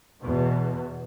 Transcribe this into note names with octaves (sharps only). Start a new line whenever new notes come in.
E2 B2